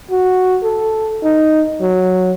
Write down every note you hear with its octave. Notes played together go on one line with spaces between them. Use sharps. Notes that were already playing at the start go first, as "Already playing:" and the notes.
F#4
A4
D#4
F#3